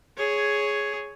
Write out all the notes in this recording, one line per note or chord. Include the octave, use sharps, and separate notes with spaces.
G#4 C#5